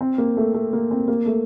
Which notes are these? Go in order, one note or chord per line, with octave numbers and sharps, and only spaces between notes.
C4
A#3
A3
A3
A#3
C4
A#3
A3